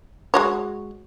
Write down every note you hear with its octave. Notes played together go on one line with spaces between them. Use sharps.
G#3 F#4 C#5